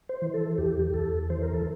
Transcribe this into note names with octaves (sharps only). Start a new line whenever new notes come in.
C5
E3
A4
E2 G4
E2 A4
E3 C5
A#4
A4